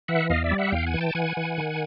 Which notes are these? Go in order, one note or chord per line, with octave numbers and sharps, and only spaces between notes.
E3 E5 F#5
E2 D#5 F5
D5 E5
G3
E5 F#5
E2 F5 G5
F#5 G#5
E3
G5 A5
E3 F#5 G#5
E3
D#3